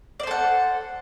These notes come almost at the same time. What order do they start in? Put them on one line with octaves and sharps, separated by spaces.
D5 C5 A4 F#5